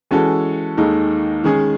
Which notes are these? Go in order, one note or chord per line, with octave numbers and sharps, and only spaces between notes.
E3 G#3 C#4 F#4 A4
D#2 D#3 G#3 D#4 A4
D#3 G#3 C#4 G#4